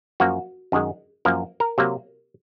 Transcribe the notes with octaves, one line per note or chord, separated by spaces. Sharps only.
F#2 F3 A#3 F#4
F#2 D#3 G#3
F#2 F3 A#3 A#4
A#4
C3 F#3 A#3